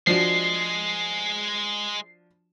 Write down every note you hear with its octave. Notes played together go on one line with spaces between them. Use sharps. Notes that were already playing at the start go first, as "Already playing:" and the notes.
F3 G#3 D4 F#4 C7